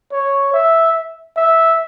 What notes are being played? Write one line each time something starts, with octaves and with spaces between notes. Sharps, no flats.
C#5
E5
E5